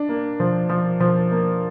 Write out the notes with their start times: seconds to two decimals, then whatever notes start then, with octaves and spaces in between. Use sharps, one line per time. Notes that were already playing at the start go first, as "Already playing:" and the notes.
Already playing: D4
0.09 A#3
0.40 F3
0.70 F3
1.00 F3
1.32 A#3